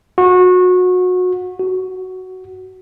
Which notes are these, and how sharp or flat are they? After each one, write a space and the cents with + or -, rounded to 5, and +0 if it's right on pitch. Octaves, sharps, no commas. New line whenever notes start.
F#4 -25
F#4 +10